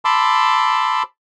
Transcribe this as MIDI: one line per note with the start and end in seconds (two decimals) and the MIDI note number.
0.05 1.03 81
0.05 1.03 83
0.05 1.03 84
0.05 1.03 86
0.05 1.03 88